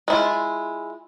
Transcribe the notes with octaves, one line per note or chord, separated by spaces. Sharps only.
G#3 E4 F4